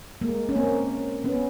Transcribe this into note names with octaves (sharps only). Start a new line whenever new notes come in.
G#3 A#3
C#4
A#3 C4
B3 C#4